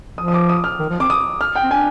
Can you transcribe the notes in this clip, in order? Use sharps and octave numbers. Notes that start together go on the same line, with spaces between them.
F3 D#6
D#6
D6
D#6
F6
D#3
F3
C4 D6
D#6
F6
G5
C4
D4 G#5